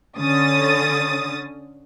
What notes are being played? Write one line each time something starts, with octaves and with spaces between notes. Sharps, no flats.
D3 C#4 D#6 A6